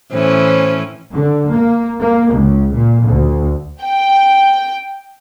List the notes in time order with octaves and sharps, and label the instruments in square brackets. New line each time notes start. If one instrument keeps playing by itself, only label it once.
[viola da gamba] A2 E3 C#4 [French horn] C5
[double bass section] D3
A#3
A#3
C#2
A#2
D2
[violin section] G5